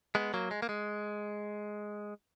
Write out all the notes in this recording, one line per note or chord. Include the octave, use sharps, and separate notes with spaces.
G#3 B3
F#3 A#3
G#3
A#3
G#3